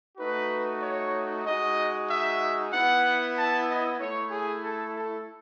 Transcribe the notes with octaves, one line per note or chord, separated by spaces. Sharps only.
A3 D#4 F#4 B4
C#5
G#3 D#4 F#4 D#5
E5
B3 E4 F#5
A5
D#5
A3 E4 C#5
G#4
A4
A4